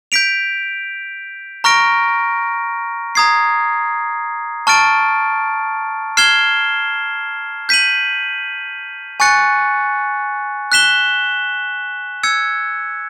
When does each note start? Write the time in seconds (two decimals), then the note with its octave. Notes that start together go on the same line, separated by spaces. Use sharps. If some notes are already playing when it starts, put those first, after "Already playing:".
0.12 G6 B6 D7 F7
1.64 A#5 C#6 F6 A#6 D7
3.15 A#5 D#6 G#6 C7
4.67 A5 C#6 F6 A6 D7
6.17 F6 G#6 C7 E7 G7
7.69 G6 B6 D#7 F#7
9.20 G#5 C#6 F#6 A6 C#7
10.72 F#6 B6 E7 G7
12.23 E6 G#6 C#7